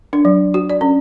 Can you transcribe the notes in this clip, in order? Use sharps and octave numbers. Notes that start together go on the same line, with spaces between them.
D4
F#3
F#4
D5
C#4